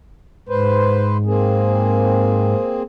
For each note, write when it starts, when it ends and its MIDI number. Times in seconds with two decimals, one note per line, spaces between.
0.49 2.55 44
0.49 1.17 71
0.49 1.17 72
1.25 2.83 58
1.25 2.83 60
1.25 2.83 68